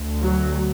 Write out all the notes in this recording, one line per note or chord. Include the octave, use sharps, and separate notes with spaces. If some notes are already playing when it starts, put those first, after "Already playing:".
Already playing: D2
F#3